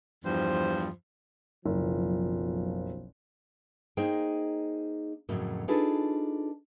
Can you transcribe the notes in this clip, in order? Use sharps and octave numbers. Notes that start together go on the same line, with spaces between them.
E2 G2 F3 C5
F#1 B1 F3
A#3 D#4 G#4 C5 D#5 G5
F2 A2 C#3 F#3 A#3
D4 D#4 F4 G#4 A4 B4